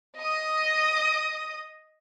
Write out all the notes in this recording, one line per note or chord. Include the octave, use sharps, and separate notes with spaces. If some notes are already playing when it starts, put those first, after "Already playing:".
D#5 D#6